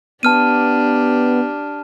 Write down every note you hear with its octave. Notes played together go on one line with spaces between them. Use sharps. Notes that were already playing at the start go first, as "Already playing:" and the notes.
B3 D4 G4 A5 F6 D#7